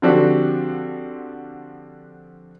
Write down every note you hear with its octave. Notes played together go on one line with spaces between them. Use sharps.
D3 F3 C4 D4 F#4 G4